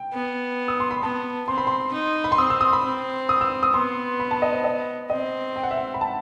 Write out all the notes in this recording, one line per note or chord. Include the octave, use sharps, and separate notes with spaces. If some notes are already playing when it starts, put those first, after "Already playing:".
Already playing: G5
B3
D#6
C6
B5
B3 A5
C4 C6
B5
C6
D#4
B5
C6
C4 D#6
E6
D#6
B5
C4
D#6
E6
D#6
B3 C6
B5
A5
D#5
C5
D#5
C4 D#5
G5
F#5
E5
F#5
B5
A5